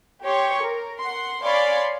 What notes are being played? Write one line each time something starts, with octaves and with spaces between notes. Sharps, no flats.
G4 C#5 C6 C#6
A#4
F#5 C6
C#5 D5 F5 G#5 B5 C6